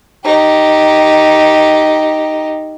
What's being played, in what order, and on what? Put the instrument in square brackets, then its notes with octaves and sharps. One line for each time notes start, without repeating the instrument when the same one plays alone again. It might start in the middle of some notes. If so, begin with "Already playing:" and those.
[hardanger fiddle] D#4 G4